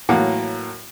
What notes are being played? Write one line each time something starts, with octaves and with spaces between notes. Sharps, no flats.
A2 E3 F#3 A#3 F#5